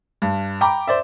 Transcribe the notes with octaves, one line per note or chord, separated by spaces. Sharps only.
G2
G5 A#5 B5 D6
C5 D5 E5